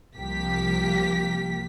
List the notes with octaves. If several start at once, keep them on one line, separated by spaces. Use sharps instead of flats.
C2 F3 A#3 G4 B6